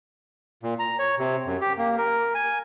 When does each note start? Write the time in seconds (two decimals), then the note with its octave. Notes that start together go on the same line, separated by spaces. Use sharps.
0.63 A#2
0.79 A#5
0.99 C#5
1.18 C3
1.45 F#2
1.61 G4
1.78 A#3
1.98 A#4
2.35 G#5